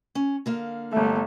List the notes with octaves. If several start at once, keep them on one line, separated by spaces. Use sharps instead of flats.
C#4
D3 A#3 F5
G1 A3 E5